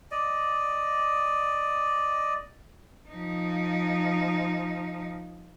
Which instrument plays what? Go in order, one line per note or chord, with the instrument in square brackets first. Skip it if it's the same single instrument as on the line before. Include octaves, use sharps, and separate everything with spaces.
[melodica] D5 D#5
[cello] F3 D#4